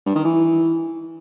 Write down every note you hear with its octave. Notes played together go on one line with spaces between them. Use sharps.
G2
D#3
E3